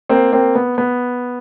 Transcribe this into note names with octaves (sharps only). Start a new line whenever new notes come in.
A#3 C4
A#3 C4
B3
B3